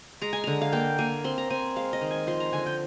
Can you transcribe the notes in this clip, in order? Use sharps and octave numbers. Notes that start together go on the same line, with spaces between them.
G#3 A#5
G#5
D3 A#5
F5
A#3 G5
A#3 G#5
C4 C6
A#5
C4 G#5
G#3 F5
D#5
D#3
G#5
F3 C6
A#5
D3 G#5
G5